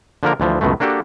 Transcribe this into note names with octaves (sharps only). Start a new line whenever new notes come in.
D3 F3 A#3 A#4
D2 E3 F3
C#2 F#2 B2 G#3 A3
A#3 D4 F#4 G4 A4